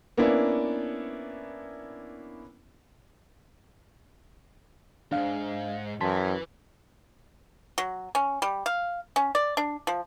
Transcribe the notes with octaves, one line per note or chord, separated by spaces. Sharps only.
A#3 B3 C#4 D4 E4
D#2 G#2 D4 F5
F#2 E3 A5 C6 B6
F#3
C#4
G3
F5
C#4
D5
D4
F3